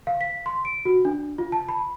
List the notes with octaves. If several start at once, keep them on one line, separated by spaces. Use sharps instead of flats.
F5
B6
C6
D7
F#4
D4
F4
A5
B5